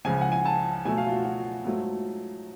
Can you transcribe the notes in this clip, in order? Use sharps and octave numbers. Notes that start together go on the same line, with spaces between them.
C#2 C#3 F3 G#5
F#5
G#5
A5
B2 F#3 A3 G#5
F5
F4
F#4
F#4
G#2 F#3 A3 F4